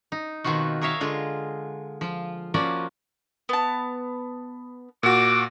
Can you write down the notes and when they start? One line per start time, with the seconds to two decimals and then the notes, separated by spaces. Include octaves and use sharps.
0.12 D#4
0.44 B2 D#3 C4 F4 F#4
0.81 G#4 A#4 C#5 E5 F5
1.01 D3 G#3 F4 G#4
2.01 F3 F4
2.54 F3 A#3 C#4 F4 F#4 D5
3.49 B3 A5
5.03 A#2 F#4 D6